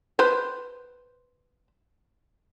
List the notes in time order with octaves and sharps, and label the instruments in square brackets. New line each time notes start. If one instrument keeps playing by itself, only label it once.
[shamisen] B4 C5